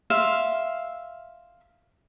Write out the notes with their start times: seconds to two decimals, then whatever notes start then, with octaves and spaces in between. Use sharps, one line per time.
0.10 E5 F5 C6